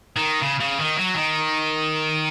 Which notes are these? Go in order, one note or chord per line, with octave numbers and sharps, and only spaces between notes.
D#3
C#3
C#3
D#3
F#3
D#3